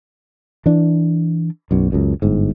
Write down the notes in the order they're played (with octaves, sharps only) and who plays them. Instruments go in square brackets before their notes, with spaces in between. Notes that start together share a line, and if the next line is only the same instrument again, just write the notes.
[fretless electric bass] E3 D4
B1 F#2
C#2 F#2
G1 G#2